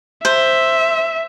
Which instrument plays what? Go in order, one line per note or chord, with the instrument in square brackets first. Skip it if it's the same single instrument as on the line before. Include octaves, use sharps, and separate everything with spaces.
[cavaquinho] C5 [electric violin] E5